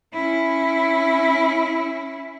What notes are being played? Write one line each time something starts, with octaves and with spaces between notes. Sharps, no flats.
C#4 E4